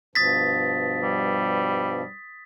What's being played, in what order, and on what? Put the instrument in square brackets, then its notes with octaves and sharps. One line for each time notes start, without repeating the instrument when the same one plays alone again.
[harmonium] G2 B2 F3 [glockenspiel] D#6 A6 B6
[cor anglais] G3